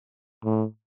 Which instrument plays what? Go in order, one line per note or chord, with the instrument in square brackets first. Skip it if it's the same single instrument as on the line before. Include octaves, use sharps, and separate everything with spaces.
[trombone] A2